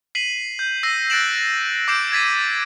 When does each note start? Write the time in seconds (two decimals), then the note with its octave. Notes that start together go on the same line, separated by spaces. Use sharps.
0.15 B6 C7 D#7 F#7
0.59 G6
0.83 E6 A#6 C7 D#7
1.10 F#6 A6 A#6 D7 E7 F#7
1.88 D6 E6 G6 C7 D7 E7
2.12 G#6 A6 B6 D#7